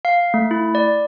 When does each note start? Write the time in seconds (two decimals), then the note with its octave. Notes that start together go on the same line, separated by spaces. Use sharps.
0.05 F5
0.34 A3
0.51 E4
0.75 D5